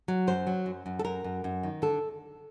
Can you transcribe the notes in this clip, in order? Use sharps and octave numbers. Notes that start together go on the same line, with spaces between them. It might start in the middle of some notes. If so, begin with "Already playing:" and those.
F#3
F#2 C5
F#3
F#2
F#2
A4
F#2 A#4
F#2
F#2
D#3
D3 A4